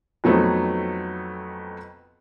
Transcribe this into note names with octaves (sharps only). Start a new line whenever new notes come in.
F2 F#3 A3 B3 C4 D#4